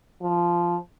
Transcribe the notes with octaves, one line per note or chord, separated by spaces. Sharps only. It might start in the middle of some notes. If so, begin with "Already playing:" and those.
F3